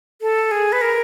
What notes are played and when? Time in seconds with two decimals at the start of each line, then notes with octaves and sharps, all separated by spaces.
0.21 A4
0.51 G#4
0.72 B4
0.81 A#4